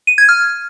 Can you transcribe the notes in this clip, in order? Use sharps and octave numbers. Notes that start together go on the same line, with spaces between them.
D#7
G#6
F6